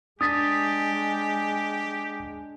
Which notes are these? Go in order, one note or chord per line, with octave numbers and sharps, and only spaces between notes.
G#3 D4 G4 D#6 A6 B6